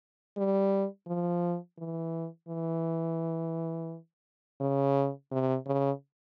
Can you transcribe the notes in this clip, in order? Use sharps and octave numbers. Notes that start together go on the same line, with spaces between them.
G3
F3
E3
E3
C#3
C3
C#3